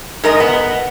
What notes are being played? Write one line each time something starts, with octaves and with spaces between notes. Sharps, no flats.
G#2 A#4 D#5
B3